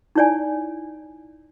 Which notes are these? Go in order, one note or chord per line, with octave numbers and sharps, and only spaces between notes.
D#4 E4 C#5 D5 G#5